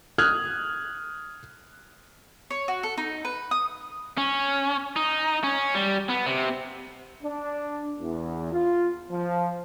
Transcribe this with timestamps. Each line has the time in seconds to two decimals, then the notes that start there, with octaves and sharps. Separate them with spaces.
0.18 D#6 F6 F#6 G#6
2.50 C#5
2.68 F#4
2.83 A4
2.98 D#4
3.25 B4
3.51 D#6
4.18 C#4
4.96 D#4
5.44 C#4
5.75 G3
6.09 B3
6.26 C3
7.23 D4
8.00 E2
8.53 F4
9.11 F3